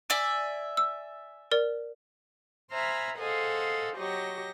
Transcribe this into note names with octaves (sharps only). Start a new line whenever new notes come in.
D5 E5 G#5
E6
A#4 D5
C5 E5 G#5 A#5 B5 F6
G#4 A4 C5 D#5 F5 F#5
F#3 G4 D#5 C#6 A#6